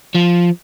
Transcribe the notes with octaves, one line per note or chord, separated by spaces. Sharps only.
F3